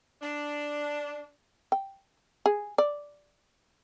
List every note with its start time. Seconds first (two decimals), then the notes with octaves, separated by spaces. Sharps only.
0.22 D4
1.72 G5
2.46 G#4
2.78 D5